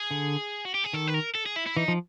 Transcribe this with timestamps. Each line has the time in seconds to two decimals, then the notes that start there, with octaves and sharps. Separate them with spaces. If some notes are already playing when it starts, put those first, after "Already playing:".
Already playing: G#4
0.11 D3
0.65 F#4
0.74 G4
0.84 G#4
0.93 D#3 A4
1.08 B4
1.14 A#4
1.35 A4
1.46 G#4
1.56 E4
1.67 E4
1.77 E3 D#4
1.88 F3